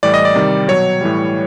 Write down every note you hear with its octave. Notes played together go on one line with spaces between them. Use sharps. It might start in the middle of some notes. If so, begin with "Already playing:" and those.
A2 E3 G3 D5
D#5
D5
C3 D#3 G3
B2 F#3 C#5
A2 E3 G3